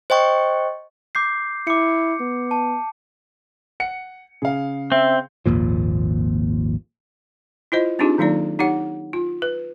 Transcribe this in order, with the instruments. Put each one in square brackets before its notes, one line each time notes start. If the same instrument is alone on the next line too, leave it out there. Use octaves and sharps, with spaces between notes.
[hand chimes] C5 D#5 G5 C#6
[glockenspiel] D6 G6 C7
[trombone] E4 [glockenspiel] D6 C#7
[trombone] B3
[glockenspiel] A5
[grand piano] F#5 C#7
[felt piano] C#3 [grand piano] G#4 F5
[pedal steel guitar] C4 [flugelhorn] E5
[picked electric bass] G#1 D#2 A#2 F3
[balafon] E4 F4 C5 D#5
C4 D4 D#4 F4 G4 G#4
D#3 F#3 A#3 D#4 D5
D#4 G4 C#5 F#5
F4
B4